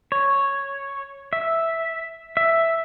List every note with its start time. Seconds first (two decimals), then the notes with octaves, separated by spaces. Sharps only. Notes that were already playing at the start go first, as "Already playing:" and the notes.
0.12 C#5
1.33 E5
2.37 E5